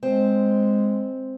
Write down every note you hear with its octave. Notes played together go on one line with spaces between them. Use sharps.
G#3 C4